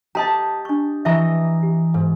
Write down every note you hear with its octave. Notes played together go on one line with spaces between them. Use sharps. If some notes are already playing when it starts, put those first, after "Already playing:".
G4 D#5 A5 A#5 C6
D4 C#6
E3 D#5 E5 A#5 C#6
G4
G#2